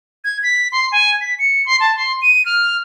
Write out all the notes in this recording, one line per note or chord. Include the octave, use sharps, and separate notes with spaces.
G#6
B6
C6
G#5
B6
C#7
C6
A5
C6
D#7
F6